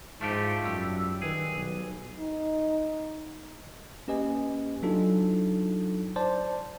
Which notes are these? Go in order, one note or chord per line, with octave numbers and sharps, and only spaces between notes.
G#2 F3 A3 D4 G4 F5 A5
F#2 G3 E6
D#3 G#4 B4
B1
D#4
A#3 C#4 G4 B4 D#5 G#5
F#3 D4 D#4 F4 A4
C5 D5 A5